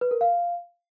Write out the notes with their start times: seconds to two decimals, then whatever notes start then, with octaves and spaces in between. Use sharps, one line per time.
0.01 B4
0.11 A#4
0.21 F5